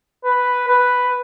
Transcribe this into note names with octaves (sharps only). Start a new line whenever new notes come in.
B4
B4